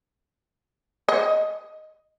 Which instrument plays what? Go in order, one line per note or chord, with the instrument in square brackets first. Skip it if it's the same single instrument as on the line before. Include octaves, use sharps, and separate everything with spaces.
[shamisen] D#5